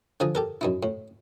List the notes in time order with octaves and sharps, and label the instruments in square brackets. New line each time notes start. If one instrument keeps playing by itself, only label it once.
[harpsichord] D3 F3 G#5 A#5 D#6
G4 A4 A#4
F#2 D#4 E4
A2